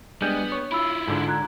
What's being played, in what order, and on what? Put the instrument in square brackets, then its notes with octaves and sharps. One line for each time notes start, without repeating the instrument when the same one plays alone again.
[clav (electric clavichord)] G3 G#3 [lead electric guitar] B3 [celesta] D4 G6
[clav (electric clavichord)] C#5
[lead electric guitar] E4 F4 [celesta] B5 E6
[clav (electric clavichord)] G#2 D3 D4
[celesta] A#5 F#6 G#6